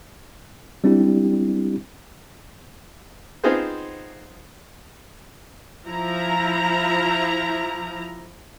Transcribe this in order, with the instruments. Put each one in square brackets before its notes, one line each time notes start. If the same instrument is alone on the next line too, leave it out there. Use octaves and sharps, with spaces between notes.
[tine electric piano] G3 C4 D4 E4 G4
[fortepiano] B3 C4 D#4 F4 G#4 C5
[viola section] F3 E4 A#5